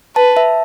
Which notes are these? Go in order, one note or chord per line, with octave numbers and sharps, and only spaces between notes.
B4 A5
E5